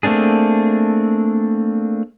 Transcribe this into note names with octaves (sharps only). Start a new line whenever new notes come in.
A3 A#3 C4 D4 G#4